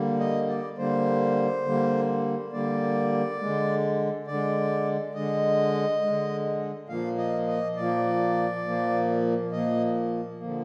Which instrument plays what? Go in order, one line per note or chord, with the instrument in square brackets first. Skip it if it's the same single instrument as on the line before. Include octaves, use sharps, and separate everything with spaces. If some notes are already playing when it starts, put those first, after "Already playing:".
Already playing: [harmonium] D3 G3 A#3
D#5
D5
D3 G3 A#3 C5
D3 G3 A#3
D3 G3 A#3 D5
D3 G#3
D3 G#3 D5
D3 G#3 D#5
D3 G#3
A#2 F3 A#3 F5
D#5
D#5
A#2 F3 A#3 D5
A#2 F3 A#3
A#2 F3 A#3 D#5
D3 F3 A#3